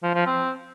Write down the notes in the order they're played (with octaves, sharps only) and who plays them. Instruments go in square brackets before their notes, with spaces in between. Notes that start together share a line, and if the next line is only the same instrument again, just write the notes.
[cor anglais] F3
F3
C4